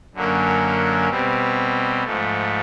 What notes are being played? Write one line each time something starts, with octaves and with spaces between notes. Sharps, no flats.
F#2 D3 F#3 A#3 C#4
B2 G3 C4
G#2 F3 A3